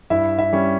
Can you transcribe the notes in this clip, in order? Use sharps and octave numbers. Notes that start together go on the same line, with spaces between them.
G2 E4 E5
E4 E5
G3 C#4